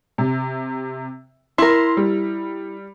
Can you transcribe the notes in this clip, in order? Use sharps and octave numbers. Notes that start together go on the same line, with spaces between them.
C3
E4 A#4 C6
G3